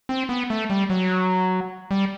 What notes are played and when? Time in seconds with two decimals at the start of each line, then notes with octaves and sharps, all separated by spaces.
0.09 C4
0.29 B3
0.50 A3
0.70 G3
0.90 F#3
1.91 G3